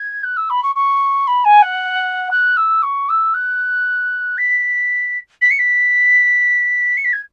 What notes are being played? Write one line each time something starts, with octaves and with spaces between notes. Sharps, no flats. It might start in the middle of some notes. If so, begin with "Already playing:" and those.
Already playing: G#6
F#6
E6
B5
C#6
C#6
B5
G#5
F#5
F#6
E6
C#6
E6
F#6
B6
B6
C#7
B6
C#7
B6
G#6